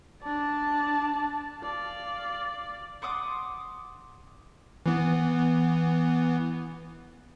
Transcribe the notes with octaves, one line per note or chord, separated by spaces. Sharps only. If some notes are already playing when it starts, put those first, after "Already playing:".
D4 D5 A5
D5 F5
F#5 C6 D6 D#6
E3 B3